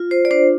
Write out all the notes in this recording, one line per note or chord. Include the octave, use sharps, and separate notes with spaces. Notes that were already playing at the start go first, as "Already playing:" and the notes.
Already playing: F4
C5
D5
D4 C5